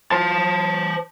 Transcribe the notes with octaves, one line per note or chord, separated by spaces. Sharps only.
C5 A5